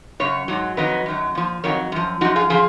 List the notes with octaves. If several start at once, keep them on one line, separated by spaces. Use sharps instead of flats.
F#2 C#3 C#5
G#2 F#3
F2 D#3 F#3 B4 D#5
F#2 D#3 F#3
A#2 F3
F2 D#3 F#3 A#4 C#5
F#2 F3
F#2 F3 D#4 F#4
F4 G#4
C#3 F3 F4 G#4